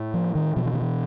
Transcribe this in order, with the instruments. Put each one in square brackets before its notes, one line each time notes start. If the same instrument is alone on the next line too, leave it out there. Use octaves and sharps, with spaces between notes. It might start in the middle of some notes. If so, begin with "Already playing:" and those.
Already playing: [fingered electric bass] A2
F3
D#3
B2 F3
E3
D#3
E3